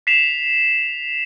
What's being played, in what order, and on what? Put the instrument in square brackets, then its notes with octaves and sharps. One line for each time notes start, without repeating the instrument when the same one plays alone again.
[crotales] B6 C7 E7 F7